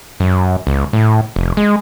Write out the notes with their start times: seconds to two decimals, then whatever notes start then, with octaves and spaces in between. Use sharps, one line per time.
0.20 F#2
0.67 C#2
0.93 A2
1.36 F1
1.57 G#3